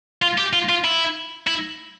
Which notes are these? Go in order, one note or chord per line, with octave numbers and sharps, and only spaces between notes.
F4
G4
F4
F4
E4
E4